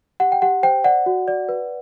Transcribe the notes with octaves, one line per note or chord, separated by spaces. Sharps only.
G4 F#5
G5
G4 F#5
C5 G5
D5 F#5
F#4
D5
B4